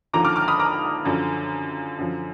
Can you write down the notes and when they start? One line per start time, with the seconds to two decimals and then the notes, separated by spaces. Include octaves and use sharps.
0.13 D#2 D3 F3 A#5 D6
0.25 D6 F6
0.36 D6 F6
0.48 B5 D#6
0.60 A#5 D6
1.05 F#2 D3 F3
1.98 F#2 D3 F3